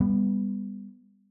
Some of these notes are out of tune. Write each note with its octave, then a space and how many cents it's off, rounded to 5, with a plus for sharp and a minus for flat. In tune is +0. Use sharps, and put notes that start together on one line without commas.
G3 +30 B3 +0